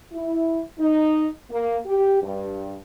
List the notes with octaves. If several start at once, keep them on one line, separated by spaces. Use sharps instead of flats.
E4
D#4
A#3
G4
G2